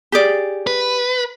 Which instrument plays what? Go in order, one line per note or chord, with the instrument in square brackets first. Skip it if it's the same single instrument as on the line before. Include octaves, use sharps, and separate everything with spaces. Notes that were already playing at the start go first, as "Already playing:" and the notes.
[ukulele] G4 G#4 D5
[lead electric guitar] B4